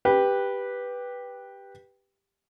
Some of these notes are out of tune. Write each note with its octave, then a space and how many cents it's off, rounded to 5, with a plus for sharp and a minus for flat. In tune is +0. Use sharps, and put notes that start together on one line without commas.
G4 +5 B4 -5